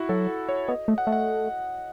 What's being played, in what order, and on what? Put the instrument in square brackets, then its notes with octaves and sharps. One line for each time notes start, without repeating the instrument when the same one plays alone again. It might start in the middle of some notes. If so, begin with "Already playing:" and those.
Already playing: [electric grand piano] E4 F#4
[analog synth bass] F#3 [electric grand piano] A4
[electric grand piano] C#5
[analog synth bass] B3 [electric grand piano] D#5
[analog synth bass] A3
[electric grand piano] F#5
[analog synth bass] A3
[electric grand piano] F#5